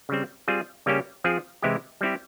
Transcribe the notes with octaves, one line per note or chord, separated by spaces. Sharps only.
C#3 G3 C4
G3 C4 F4 G#4
C#3 G3 A#3 C#4 G4
F3 C4 F4 G#4
C3 E3 G#3 E4 G4
G3 C4 E4 G4